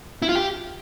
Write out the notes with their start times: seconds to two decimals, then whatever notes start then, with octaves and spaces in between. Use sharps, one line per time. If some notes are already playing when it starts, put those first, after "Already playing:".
0.22 E4
0.29 F4
0.35 G4